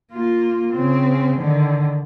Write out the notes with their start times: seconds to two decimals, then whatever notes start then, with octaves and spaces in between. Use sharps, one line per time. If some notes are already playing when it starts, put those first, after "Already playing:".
0.12 A#3 F4
0.73 C#3 C4
1.38 D3 D#3